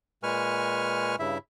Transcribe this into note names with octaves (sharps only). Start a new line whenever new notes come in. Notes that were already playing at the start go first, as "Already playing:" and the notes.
A#2 G#3 B4 G#5 C#6 F6
G2 C#3 E4 E5